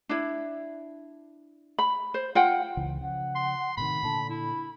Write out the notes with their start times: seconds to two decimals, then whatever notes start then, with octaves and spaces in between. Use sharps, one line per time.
0.09 D4 E4
1.79 B5
2.14 C5
2.35 F4 F#5 G5
2.77 C#2 C#3 E3
3.01 C#3 F3 F#5
3.35 C6
3.77 A2 C3 D#3 B5
4.03 A#2 D3 A5
4.29 E4 B5